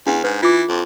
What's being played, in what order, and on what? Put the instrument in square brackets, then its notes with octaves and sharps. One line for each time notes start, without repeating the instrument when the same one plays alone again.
[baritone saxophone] E2 [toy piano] D4
[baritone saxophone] G#2 [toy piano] B4
[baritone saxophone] E3 [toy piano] F4 D6
[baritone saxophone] F2